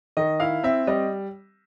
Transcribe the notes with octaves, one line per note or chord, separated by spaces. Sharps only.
D#3 D#5
E4 F5
C4 E5
G3 D#5